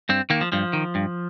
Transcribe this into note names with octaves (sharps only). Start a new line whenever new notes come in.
G2 C4
D#3 A#3
F3
G2 F3
D#3
G2